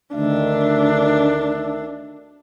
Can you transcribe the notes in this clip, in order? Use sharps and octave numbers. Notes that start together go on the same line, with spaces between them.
D2 D#3 D4 E5